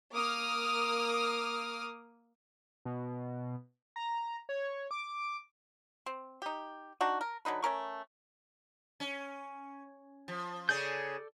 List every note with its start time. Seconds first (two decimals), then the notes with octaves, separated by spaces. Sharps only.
0.13 A#3 D6 D#6 F6
2.85 B2
3.96 A#5
4.49 C#5
4.91 D6
6.06 C4
6.42 D#4 G4
7.01 D4 D#4 F#4
7.21 A#4
7.45 D3 F#3 D#4 B4
7.62 A3 C#4 A#4 C#6
9.00 C#4
10.28 F3
10.69 C#3 C#4 G#4 A4 D5 G6